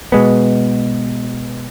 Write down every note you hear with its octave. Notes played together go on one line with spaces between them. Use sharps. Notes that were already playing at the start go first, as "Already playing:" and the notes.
B2 G#3 B3